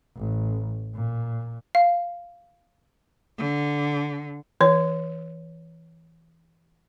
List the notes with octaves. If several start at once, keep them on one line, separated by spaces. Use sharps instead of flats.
A1
A#2
F5
D3
E3 C#5